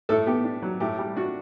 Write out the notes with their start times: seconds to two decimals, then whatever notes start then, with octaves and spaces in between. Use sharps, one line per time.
0.09 A2 A4
0.26 B3 G4
0.44 D4
0.62 F#3
0.80 A2 G4
0.98 G3
1.16 D4 F#4